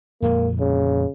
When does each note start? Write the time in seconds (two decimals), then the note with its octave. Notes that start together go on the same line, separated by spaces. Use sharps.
0.22 F2 A#2 G#3 A#3
0.59 C#3